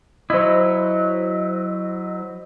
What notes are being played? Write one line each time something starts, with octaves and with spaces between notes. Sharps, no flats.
F#3 E4 C5 D#5